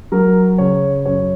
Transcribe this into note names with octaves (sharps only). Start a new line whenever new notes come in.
F#3 A#4
C#3 C#5
F#2 C#5